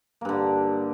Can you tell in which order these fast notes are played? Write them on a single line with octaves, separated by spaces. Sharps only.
A#3 G2 D3